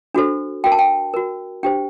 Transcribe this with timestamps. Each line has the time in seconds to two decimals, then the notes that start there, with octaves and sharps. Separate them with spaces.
0.14 D4 F#4 A4 C5
0.64 F#4 A#4 G5
0.72 A5
0.79 G5
1.14 F#4 A#4
1.63 D4 G4 C5 G5